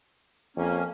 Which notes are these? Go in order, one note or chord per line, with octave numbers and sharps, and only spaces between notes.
F2 A#3 C#4